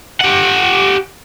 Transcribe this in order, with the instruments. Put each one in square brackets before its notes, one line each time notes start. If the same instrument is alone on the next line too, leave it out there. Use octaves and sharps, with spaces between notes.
[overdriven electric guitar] G4 F#5